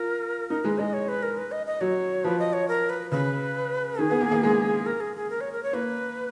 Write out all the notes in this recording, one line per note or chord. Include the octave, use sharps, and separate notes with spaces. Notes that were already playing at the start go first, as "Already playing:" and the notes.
Already playing: F4 A#4
D#4 A#4
G#3 B4
G#3 D#5
C#5
B4
A#4
B4
D#5
D#5
F#3 C#5
F3 B4
D#5
C#5
A#4
B4
C#3 B4
D#3 G#4
B3
A#3
A#3
G#3
A#4
G#4
G#4
A#4
C#5
A#4
C#5
A#3 B4